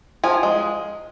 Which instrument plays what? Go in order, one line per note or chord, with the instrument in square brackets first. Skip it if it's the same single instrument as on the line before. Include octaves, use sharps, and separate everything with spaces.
[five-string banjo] F3 G#5
G#3